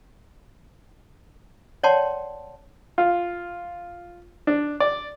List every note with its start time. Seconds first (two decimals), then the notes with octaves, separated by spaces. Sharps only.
1.83 C#5 D5 F#5 G5 A5 C6
2.98 F4
4.47 D4
4.80 D5